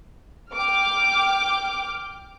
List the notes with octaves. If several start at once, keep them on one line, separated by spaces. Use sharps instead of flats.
G5 D6 F6